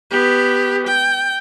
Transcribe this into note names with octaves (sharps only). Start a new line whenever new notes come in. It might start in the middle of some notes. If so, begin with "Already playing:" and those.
B3 G4
G5